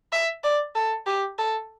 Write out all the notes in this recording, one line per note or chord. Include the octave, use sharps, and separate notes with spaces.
E5
D5
A4
G4
A4